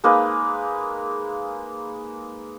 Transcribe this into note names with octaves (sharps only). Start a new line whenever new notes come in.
G#3 A#3 D#4 B4